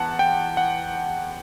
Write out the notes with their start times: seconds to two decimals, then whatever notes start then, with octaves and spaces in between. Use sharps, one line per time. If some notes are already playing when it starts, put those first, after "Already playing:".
Already playing: E2 F#5 A5
0.19 G5
0.57 F#5